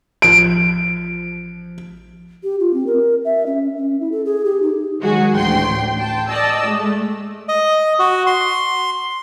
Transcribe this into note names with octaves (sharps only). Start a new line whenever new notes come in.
A1 F3 D7
G4
F4
C4
A#4
E5
C#4
C#4
E4
A4
G#4
G4
D#4
D#3 F#3 G#3 F#4 G#4
A1 D2 A2 G5 C6
G5 A5
D5 D#5 A5 E6
G#3 A3
D#5
F#4
C6